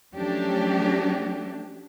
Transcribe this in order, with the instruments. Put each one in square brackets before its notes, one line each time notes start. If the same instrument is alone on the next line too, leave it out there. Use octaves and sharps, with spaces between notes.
[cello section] F3 F#3 A3 C#4 D4 G4